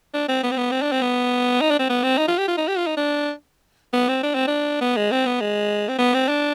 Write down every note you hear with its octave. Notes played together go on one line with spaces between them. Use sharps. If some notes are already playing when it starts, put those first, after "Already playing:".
D4
C4
B3
C4
B3
C4
D4
C4
B3
D#4
D4
C4
B3
C4
D#4
F4
G4
F4
D#4
G4
F4
D#4
D4
B3
C4
D4
C4
D4
B3
G#3
C4
B3
G#3
C4
B3
C4
D4